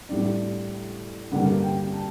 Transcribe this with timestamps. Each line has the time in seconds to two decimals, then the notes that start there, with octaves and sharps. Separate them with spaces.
0.09 A2 G3 D4 D5
1.32 G2 D3 G3 A#3 F#5
1.63 G5
1.93 A5